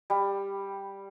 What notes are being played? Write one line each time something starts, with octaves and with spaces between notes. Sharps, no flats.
G3